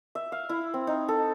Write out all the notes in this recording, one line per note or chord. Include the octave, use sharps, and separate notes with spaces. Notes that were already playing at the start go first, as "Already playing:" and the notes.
E5
F5
E4
C4
D#4
A4